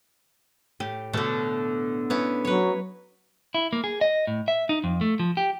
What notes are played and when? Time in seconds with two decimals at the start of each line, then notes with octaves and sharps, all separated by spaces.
0.80 A2 G4
1.13 B2 D3 A3
2.10 B3 C#4 E4
2.45 F#3 B4 C#5
3.54 E4
3.73 A#3
3.84 G#4
4.01 D#5
4.27 A2
4.48 E5
4.69 D#4
4.84 F2
5.01 A3
5.20 F3
5.37 G4